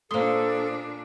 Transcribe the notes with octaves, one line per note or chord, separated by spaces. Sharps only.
A#2 A#3 D4 A4 C5 C6 D#6